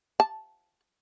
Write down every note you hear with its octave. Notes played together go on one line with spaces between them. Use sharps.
A5